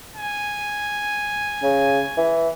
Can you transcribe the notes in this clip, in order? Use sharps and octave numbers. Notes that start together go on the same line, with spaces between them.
G#5
C#3
E3